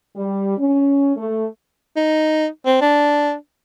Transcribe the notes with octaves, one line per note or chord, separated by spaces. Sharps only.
G3
C#4
A3
D#4
C4
D4